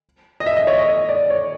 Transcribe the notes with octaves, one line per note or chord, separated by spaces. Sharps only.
D#5
E5
D#5
C#5
D#5
D#5
D5
C#5